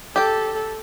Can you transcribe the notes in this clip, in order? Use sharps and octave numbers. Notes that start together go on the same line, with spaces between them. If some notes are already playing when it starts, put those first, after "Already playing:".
G4 A4 G5